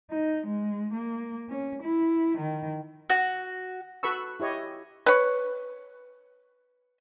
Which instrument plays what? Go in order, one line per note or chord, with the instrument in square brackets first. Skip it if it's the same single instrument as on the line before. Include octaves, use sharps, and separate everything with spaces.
[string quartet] D#4
G#3
A#3
C#4
E4
D#3
[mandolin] F#4
[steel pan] F#4 A4 B4 B5 C#6 E6
E4 G4 C#5 D#5
[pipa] B4 C#5